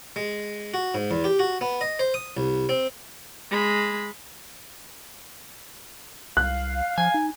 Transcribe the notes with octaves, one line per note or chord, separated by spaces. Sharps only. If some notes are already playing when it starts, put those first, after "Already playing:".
G#3
F#4
G#2
E2
G4
F#4
B3
D#5
C5
D#6
C2
C4
G#3 B5
C2 F5 F#6
F3 G#5
D#4